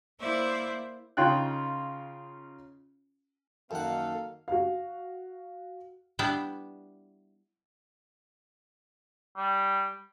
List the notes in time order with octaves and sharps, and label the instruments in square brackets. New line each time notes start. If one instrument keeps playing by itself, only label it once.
[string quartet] A#3 E4 C5 D5 E5
[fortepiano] C#3 C#4 D#4 F4 G5 F#6
[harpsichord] F#2 F#5 [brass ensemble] D#3 A#3 [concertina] A4 [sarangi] F5
[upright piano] F#4 F5
[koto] G3 B3 D4 E4 D5 G5
[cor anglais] G3